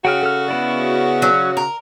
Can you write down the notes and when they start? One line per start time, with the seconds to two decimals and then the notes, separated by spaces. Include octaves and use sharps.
0.05 C#3 F#4 F#5 G5 F6
0.23 A4 F6
0.48 B3 E4 D5
1.22 F#3 C#4
1.57 A#4